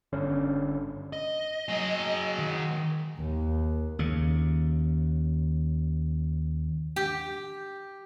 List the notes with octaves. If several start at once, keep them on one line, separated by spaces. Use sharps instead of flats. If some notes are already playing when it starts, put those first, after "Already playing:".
G1 D3 C#4
D#5
F#3 G#4
D#3
D#3
D#2
D#2 C#3
G4